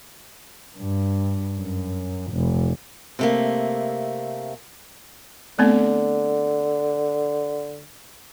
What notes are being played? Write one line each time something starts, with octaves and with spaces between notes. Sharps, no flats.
G2
F#2
F1
C3 A3 A#3
D3 A3 B3 C4